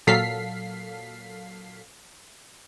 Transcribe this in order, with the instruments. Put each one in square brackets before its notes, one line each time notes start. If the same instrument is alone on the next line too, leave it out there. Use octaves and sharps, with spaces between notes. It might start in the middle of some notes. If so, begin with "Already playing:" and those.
[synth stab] A#2 F#3 A4 F5 B6 C7